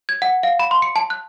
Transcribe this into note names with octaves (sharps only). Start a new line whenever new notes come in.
G#6
F#5
F5
B5
C6
C#7
A5
F#6